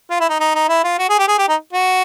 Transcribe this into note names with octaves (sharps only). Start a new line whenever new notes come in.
F4
E4
D#4
D#4
D#4
E4
F4
F#4
G#4
G4
G#4
G4
D#4
F#4